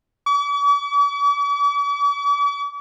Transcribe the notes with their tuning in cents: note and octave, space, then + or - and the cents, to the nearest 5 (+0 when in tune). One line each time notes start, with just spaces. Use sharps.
D6 -45